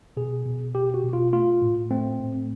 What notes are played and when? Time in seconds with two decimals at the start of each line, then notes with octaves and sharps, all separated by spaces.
0.17 B2 G#4
0.46 B2
0.75 B2 G4
0.94 F#4
1.04 B2
1.13 F4
1.33 A3 F4
1.62 A2
1.90 A3 C4
2.19 A2